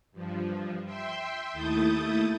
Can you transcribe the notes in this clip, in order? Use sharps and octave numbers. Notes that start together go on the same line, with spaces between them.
G2 F3
E5 G5 C6
D#2 A3 E4 D#6 G6 A6